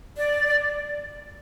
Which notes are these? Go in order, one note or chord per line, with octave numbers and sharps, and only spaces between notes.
D5